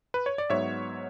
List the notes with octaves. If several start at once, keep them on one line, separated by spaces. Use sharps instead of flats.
B4
C#5
D5
G#2 F#3 B3 C#5 E5